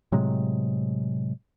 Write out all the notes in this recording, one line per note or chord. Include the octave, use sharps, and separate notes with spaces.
A2 C3 F#3 G#3